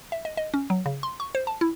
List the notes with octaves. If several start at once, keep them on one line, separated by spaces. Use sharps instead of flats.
E5
D#5
D#5
C#4
F#3
C#3
C6
C#6
C5
A5
E4